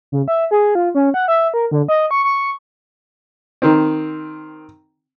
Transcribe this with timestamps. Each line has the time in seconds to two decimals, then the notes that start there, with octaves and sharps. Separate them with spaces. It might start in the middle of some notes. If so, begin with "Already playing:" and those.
0.12 C#3
0.28 E5
0.51 G#4
0.75 F4
0.95 C#4
1.14 F#5
1.28 E5
1.54 A#4
1.71 D3
1.88 D#5
2.11 C#6
2.24 C#6
3.62 D#3 C4